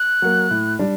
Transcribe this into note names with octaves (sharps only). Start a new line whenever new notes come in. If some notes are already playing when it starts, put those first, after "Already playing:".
Already playing: F#6
F#3 A#3
A2
G3 D4